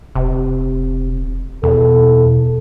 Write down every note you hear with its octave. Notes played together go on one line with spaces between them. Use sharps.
E1 C3
E2 B2 A4